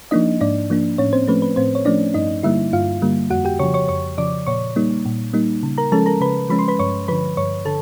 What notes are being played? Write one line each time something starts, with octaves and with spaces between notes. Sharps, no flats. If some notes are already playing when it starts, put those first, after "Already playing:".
F3 A#3 D4 D#4 D#5
G#2 D4 D5
F3 A#3 D4
A2 C#4 C#5
C4 C5
F3 A3 C#4 B4
B4
A2 C4 C5
C#5
F3 A3 C#4 D4 D5
G2 D#4 D#5
D3 G3 A#3 E4 E5
G2 F4 F5
D3 G3 A#3
F2 F#4 F#5
G4 G5
C#3 F3 C#5 C#6
C#5 C#6
F2 C#5 C#6
C#3 F3 D5 D6
A#2 C#5 C#6
G3 A#3 D#4
A#2
G3 A#3 D#4
C#3
A#4 A#5
F3 G#3 C#4 A4 A5
A#4 A#5
C#3 B4 B5
F3 G#3 C#4 B5
C6
B4 B5
G2 C#5 C#6
D3 F3 B4 B5
G2 C#5 C#6
D3 A4 A5